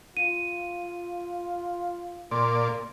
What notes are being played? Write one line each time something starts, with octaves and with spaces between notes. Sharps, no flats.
F4 D#7
A#2 A#3 D5 C6